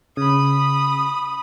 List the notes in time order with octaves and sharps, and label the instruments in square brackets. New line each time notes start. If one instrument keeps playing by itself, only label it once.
[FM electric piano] C#3 [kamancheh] B5 D#6